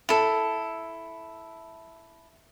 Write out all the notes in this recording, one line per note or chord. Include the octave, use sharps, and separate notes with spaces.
E4 A4